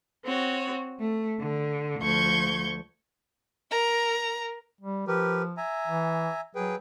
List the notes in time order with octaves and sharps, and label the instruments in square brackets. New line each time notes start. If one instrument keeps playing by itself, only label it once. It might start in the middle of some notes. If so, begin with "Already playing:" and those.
[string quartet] C4 F#4 C#5
A3
D3
D2 F3 C#6 G6 G#6
[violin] A#4 A#5
[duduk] G3
[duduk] F3 [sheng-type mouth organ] G4 A#4 B4
[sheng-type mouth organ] E5 G#5 A#5
[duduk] E3
[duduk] F#3 [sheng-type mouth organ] G#4 B4 G5